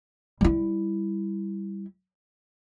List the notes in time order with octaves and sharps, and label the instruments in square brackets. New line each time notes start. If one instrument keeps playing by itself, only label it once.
[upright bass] G3 E4